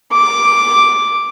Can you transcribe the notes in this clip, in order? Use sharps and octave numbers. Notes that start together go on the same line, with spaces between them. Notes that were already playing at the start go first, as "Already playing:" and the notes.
D6